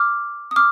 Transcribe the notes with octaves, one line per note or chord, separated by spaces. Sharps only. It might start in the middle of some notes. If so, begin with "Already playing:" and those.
Already playing: D6 F6
D#6
D6 F6